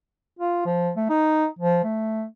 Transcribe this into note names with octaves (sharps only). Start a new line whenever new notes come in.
F4
F3
A3
D#4
F3
A3